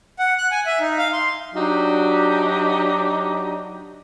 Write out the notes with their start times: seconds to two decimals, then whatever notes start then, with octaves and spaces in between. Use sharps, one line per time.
0.19 F#5
0.38 F#6
0.51 G#5
0.66 E5
0.80 D#4
0.98 F5
1.13 C6
1.54 F#3 D4 D#4 F#4 G4